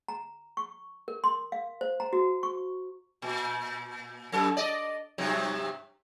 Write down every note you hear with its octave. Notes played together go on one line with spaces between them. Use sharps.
A#5
C#6
A#4
C6
F5
C5
A#5
F#4
C#6
A#2
F#2 A4
D5 D#5
G2 C3 F#3